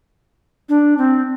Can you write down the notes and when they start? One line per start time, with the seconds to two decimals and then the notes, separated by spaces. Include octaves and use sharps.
0.69 D4
0.98 C4